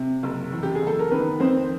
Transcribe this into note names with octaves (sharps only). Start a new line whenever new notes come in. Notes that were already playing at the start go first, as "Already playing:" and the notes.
Already playing: C3
F#1
E2
G4
G#4
F#1 A4
A#4
D#3 B3 B4
F2 C4 C5